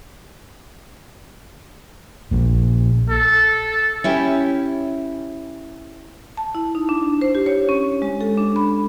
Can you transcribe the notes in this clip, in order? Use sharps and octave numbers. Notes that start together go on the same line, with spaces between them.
A#1 A#2
A4
C#4 E4 G4
A5
E4
D#4
D4
C5
G4
C#5
C#4
G#3
A4
D4
B5